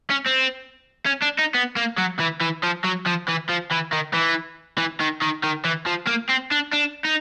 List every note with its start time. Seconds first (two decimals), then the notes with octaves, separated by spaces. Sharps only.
0.10 C#4
0.26 C4
1.06 C#4
1.22 D4
1.39 D#4
1.55 B3
1.76 A#3
1.98 F#3
2.19 E3
2.41 E3
2.63 F3
2.84 F#3
3.06 F3
3.28 E3
3.49 F3
3.71 E3
3.92 D#3
4.14 E3
4.78 E3
5.01 D#3
5.22 D#3
5.44 D#3
5.65 E3
5.87 F3
6.07 A#3
6.29 C4
6.51 D4
6.72 D4
7.05 D#4